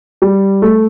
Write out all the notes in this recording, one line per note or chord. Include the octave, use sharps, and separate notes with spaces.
G3
A3